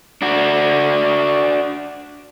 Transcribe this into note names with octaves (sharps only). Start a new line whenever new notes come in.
D4 F#4